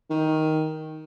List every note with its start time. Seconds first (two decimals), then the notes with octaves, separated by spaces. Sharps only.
0.10 D#3